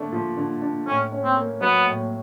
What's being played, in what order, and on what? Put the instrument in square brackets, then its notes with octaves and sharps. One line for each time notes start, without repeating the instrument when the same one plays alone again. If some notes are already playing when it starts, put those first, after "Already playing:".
Already playing: [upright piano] D3 A3 D4
F3
D3
D4
[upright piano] A2 [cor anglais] C#4
[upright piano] C#4
[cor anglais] C4
[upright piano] A#3
[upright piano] F#3 [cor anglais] B3
[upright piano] A2